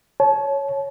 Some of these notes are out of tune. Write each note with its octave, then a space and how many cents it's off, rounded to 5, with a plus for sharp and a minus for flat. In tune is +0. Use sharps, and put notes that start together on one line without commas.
C#5 +0 A5 -30